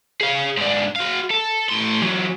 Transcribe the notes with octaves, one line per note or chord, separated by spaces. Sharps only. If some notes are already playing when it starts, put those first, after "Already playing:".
G#4 F5
G#2 D4
F#4 F5
A4
A2 C6
E3 F#3